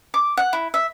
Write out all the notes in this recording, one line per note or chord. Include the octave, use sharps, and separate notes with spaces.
D6
F#5
E4
E5